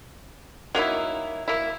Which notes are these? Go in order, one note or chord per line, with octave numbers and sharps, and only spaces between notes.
F#3 A#3 D#4 E4
A#3 E4